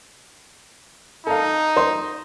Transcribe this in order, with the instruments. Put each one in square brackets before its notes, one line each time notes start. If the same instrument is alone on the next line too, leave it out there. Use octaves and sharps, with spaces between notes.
[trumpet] D#4 [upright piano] A4 F5
[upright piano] C5 C6